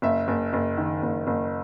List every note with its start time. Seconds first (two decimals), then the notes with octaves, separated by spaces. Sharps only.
0.02 F#1 E5
0.28 F#1
0.53 F#1
0.77 D#3
1.02 F#1
1.27 F#1